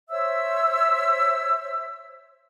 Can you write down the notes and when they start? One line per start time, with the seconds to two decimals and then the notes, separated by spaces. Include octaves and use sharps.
0.10 C5 C#5 E5 E6